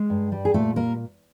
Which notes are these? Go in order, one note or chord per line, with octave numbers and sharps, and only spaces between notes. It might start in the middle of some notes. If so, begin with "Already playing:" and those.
Already playing: G#3
G2
G3
G#4
A#2 A3 A4
G3 A#3 A#4